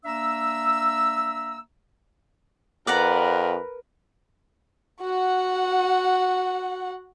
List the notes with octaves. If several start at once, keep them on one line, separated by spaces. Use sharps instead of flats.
A#3 D4 E5 A#5 E6
F2 A#4 B4 D5 F#5 A#5
F#4 F#5